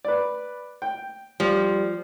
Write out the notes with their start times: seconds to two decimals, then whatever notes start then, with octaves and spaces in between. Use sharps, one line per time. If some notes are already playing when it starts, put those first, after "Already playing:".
0.05 B4 D5
0.82 G5
1.40 F3 G3